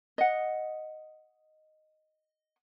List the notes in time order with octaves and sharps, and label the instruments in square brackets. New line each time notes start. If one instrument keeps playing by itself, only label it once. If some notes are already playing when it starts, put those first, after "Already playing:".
[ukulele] D#5 F#5